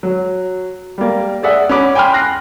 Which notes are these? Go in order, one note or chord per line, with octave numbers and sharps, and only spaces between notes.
F#3
G3 A#3
G#4 D5 E5 F#5
C#4 F#5 B5 D6
G5 G#5 B5 C6 F6
F#6 A#6 C7